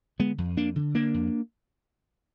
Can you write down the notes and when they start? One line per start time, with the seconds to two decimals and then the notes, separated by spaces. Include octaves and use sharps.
0.19 D3 G#3 B3
0.38 F2
0.57 F2 A#3 D4
0.76 D3
0.94 D3 A#3 D4
1.14 F2